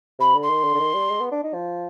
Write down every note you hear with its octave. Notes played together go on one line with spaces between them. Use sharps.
C3 B5
D3
C6
D#3
D3
D3
D#3
G3
G#3
B3
D4
D#4
F3